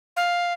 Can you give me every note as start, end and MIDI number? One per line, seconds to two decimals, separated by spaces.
0.17 0.53 77